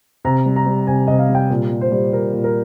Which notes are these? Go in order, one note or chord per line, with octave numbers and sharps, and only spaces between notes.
C3 A#5
G3
A#5
G3
C3 G#5
C3 D#5
F5
G3
G5
A#2
G3
C5
G3
A#2 A#4
A#2
A#4